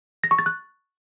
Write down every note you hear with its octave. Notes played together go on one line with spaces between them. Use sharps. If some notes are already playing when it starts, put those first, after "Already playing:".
A#6
C#6
A6
F#6